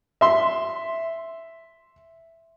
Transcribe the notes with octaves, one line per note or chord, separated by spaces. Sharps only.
E5 C6